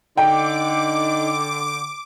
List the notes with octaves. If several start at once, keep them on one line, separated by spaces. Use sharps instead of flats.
D3 D#4 G5 D6